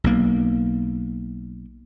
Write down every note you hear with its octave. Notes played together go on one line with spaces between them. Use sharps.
B1 A#3